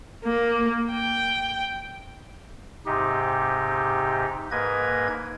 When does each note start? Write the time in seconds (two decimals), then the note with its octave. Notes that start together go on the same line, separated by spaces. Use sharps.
0.25 A#3
0.93 G5
2.86 G#2 C3 D#4 G4
4.51 G#2 A#3 B4 D#5 G#6